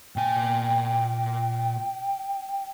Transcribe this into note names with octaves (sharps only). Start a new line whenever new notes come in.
A#2 G5 G#5